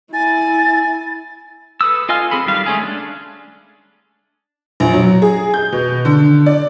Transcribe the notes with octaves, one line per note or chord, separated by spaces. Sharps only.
E4 G#5 A6
A4 B4 D#6 E6
F4 D#5 F5 G#5 F6
C4 G#4 A4 B5
D#3 G3 F5
G#3 A3 C#4 G#4
D4
A#1
F#3
G#4
G6
B2
D3
D5